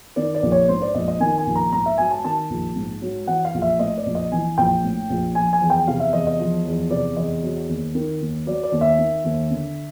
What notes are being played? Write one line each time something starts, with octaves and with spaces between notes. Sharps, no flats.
D#3 D5
D5
A#1
C#5
G#2 C5
D5
A#1 D#5
D#5
D#3 G#5
G#5
A#1
A#5
G#2 A#5
E5
F#3 G#5
A5
D#3 A5
A#1
G#2
F#3
E3 F#5
F5
A#1
E5
A2 D#5
D5
A#1
D#5
E3 G#5
A#1 G5
A2
A#1
F3 G#5
G#5
E2
G5
C3 F5
E5
E2 D#5
D#5
F3
E2
C3 D5
E2 D#5
F#3
D#2
D#3
D#2
F#3 D5
D5
D#2
E5
D#3
D#2
D3